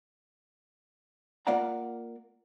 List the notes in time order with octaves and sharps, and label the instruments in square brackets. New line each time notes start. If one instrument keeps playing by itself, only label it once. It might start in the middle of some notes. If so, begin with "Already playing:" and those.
[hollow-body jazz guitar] A#3 F4 D5 F5 F#5 A#5